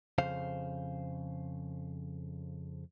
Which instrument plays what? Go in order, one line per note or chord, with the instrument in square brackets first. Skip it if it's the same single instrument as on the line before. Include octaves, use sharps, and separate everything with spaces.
[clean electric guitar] F2 C#3 C5 F5